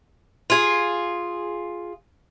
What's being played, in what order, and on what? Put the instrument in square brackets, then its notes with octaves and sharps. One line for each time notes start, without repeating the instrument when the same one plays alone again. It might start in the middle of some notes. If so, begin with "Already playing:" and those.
[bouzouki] F4 G#4